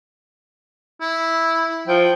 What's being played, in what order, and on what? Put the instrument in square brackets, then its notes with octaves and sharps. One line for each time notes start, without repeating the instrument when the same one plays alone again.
[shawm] E4
[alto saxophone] F3 [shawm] G5